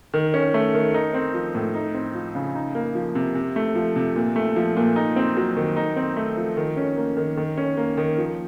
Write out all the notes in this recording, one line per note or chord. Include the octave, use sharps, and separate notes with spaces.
D#3
C#4
A3
D#3
D#4
C4
F3
A2
D#4
C4
F3
C#3
D#4
A#3
F3
C3
C3
A3
F3
C3
A#2
A3
F3
A#2
D#4
C4
F#3
D#3
D#4
C4
A3
F3
D#3
C#4
A#3
D#3
D#3
C#4
A#3
D#3
F3